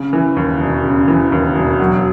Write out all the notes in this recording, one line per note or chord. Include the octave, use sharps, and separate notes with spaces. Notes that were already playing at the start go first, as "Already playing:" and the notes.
Already playing: C#3
E3
D#2
E1
C#3
E3
D#2
E1
F#3